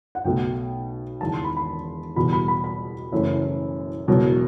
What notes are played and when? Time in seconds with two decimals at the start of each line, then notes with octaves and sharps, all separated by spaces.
0.15 F#5
0.24 B1 B2 A3 G5
1.21 E1 E2 D#3 A5
1.34 C6
1.44 B5
1.57 B5
2.16 E2 B2 G3 B5
2.33 B5
2.48 B5
2.64 B5
3.12 F#1 F#2 E3 A3
4.08 E1 E2 B2 F#3